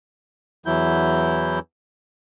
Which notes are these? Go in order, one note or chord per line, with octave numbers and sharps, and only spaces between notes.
E2 E3 F#3 E4 G6